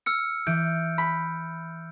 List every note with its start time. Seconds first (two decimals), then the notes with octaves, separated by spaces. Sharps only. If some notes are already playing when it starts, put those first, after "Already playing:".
0.06 E6 F6 C#7
0.47 E3 G6 D7
0.98 B5